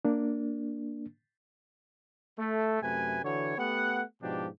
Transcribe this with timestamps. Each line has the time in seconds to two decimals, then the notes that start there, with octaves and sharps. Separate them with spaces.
0.05 A#3 D4
2.38 A3
2.81 F#2 C3 A3 B4 G#5
3.23 D3 E3 F#4 C#5
3.57 A3 B3 G4 F#5
4.21 G#2 B2 F3 D4 G4